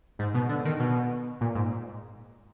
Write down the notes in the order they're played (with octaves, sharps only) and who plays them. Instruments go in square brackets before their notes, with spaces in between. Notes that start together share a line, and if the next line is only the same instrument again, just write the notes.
[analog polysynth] G#2
B2
D3
D#3
B2
A#2
G#2